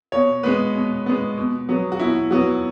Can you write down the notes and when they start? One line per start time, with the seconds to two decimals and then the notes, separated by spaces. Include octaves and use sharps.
0.12 B2 C#5
0.43 G#3 B3 B4
0.74 B2
1.06 G#3 B3
1.37 B2
1.69 F#3 B3
1.92 F#4
2.00 B2 E4
2.31 F#3 B3 F#4